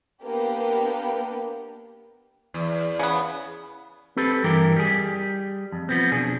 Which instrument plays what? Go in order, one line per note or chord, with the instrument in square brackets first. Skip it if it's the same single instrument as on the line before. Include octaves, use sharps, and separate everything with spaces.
[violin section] A#3 B3 D4 G4 A#4 B4
[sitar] E2
[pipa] C#3 B3
[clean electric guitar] C4 G4 A4 B4
G2 E3 E4 G4 A#4
G3 G4 G#4
F2
F3 B3 C4
B2 D4 G#4